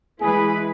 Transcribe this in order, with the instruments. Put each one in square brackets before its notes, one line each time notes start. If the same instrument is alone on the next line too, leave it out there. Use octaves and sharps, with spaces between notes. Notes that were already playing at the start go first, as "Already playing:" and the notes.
[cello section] E3 G#3 E4 B4 [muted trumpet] G#4